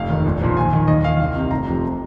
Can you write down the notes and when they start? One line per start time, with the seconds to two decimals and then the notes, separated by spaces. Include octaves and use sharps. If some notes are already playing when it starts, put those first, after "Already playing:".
Already playing: F1 F5
0.09 D#2 D#3
0.25 A#1
0.41 A#2 F3
0.57 D#2 G#5
0.73 D#3
0.87 D#2 D#5
1.04 D#3 F5
1.20 C2 F5
1.36 C3 D#3
1.51 F1 A#5
1.67 F2 C3 F3